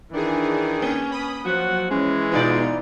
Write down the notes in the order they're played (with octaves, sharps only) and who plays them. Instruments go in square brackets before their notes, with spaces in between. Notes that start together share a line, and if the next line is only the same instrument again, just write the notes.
[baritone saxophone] D#3 [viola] E3 [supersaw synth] D4 G#4
[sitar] A#3 [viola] C#4
[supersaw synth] B5 D#6
[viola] F3 F#5 [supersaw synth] F#3 [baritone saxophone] F#4
[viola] E3 [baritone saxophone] G#3 [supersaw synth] C#4
[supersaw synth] B2 F4 [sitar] B3 D#4 D5